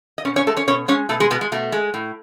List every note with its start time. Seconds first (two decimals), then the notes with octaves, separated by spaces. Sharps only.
0.18 D#5
0.25 B2 C#4 C#5
0.36 C#4 C#5
0.47 G#3 A3 A4
0.57 C#4 C#5
0.67 B2 C#4 C#5
0.88 G#3 C#4 C#5
1.09 B2 A3 A4
1.20 G#3 G#4
1.30 B2 G#3 B3
1.41 G#3
1.52 B2 A3
1.72 G#3
1.94 A2